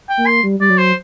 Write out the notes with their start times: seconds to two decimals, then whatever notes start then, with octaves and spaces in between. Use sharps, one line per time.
0.09 G5
0.17 A#3
0.27 C6
0.43 G3
0.60 G3 D5
0.70 F#3
0.78 C5